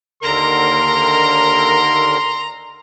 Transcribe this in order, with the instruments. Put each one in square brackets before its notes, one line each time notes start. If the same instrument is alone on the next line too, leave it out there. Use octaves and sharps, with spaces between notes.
[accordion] D#2 D3 A#4 [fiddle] A#5 [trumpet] C6